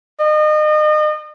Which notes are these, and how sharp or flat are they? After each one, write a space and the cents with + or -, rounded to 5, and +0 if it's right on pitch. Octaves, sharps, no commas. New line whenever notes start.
D#5 -35